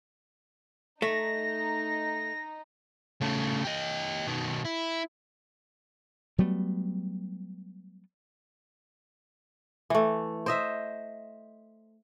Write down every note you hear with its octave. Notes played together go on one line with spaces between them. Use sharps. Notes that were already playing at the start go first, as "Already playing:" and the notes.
A3 D#4 A#6
C#3 A3
G4 D#5
B2 D#3
E4
F#3 G3 A3 B3
E3 A3
C5 D#5 E5